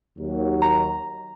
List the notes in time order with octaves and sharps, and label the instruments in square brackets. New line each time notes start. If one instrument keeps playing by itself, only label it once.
[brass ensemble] D#2 F#3
[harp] A#5